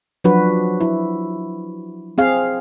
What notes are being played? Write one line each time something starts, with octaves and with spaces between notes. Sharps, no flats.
F3 F#3 D4 F#4 B4
E4
C4 G#4 F5